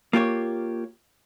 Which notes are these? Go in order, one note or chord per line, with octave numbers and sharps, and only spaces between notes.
A#3 F4 G4 C#5